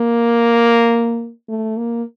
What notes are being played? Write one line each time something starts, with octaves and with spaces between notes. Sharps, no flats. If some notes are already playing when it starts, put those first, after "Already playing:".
Already playing: A#3
A3
A#3